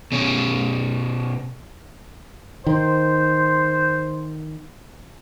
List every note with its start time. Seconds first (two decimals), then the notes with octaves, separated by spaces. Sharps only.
0.12 B2 C#4
2.67 D#3 C5